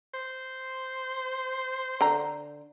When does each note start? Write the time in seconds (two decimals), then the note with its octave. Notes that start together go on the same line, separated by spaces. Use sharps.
0.14 C5
2.01 D3 A#5